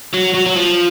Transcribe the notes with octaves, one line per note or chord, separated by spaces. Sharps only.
F#3
F#3
F#3
F3